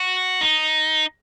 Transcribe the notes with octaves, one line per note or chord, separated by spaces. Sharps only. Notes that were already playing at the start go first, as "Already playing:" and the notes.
Already playing: F#4
D#4